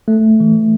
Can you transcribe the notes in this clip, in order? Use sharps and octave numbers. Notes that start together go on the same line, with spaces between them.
A3
E3